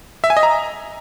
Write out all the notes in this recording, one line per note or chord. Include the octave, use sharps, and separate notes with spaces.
E5
G#5
D#5
A#5